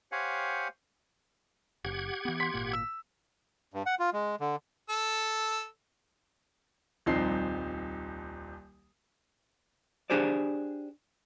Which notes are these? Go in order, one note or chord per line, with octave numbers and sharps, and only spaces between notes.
G4 C5 C#5 F5 F#5 G#5
F#1 G4 F#5 G#6
E3 B3
C6 B6
G#1 A#2 A#3
E6
G2
F#5
F4
G#3
D3
A4 E6
D#1 C2 F3 C4 D#4 C7
D4 G4 G#4 C5 D5